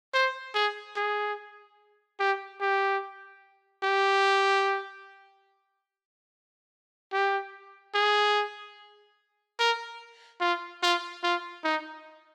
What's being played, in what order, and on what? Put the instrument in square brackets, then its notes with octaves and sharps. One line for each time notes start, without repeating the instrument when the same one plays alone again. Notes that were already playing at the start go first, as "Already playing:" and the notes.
[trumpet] C5
G#4
G#4
G4
G4
G4
G4
G#4
A#4
F4
F4
F4
D#4